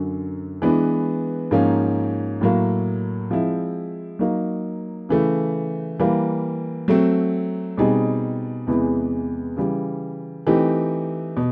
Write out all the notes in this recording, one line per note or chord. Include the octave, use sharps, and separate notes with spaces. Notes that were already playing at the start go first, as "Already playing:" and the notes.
Already playing: F#2 D3 F#3
E3 G#3 B3 D4
G#2 F3 A#3 C#4
A2 F#3 A#3
F3 G#3 C4 E4
F#3 A#3 D#4
C#3 E3 A3
E3 G3 A#3
F#3 A3 C4
B2 G3 C4 D#4 G#4
E2 C3 E3 G#3 B3
C#3 E3 G3
E3 A3 C4 D#4 G4
B2